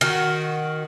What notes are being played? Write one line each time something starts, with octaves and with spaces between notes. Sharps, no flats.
D#3 F#4